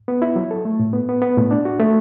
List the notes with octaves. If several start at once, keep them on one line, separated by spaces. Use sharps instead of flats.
B3
E4
F#3
A4
A3
A2
B3
B3
B3
A2
D4
F#4
A3